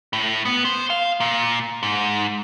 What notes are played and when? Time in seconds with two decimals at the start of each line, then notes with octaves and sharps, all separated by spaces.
0.13 A2
0.45 B3
0.65 C5
0.90 F5
1.20 A#2
1.83 G#2